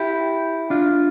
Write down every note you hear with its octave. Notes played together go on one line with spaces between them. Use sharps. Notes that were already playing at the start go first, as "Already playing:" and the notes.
Already playing: E4 G4
D4 F4